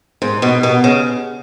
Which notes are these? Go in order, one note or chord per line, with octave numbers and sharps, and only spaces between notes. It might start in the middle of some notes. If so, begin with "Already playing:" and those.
G#2
B2
B2
C#3